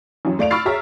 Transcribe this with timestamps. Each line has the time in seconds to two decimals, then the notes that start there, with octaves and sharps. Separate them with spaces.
0.25 A1 F#2
0.39 A3 D5 F5 D7 F7
0.51 B5 C#6 E6 F6 A6 C7
0.65 F#4 G#4 C#5 E5 A#5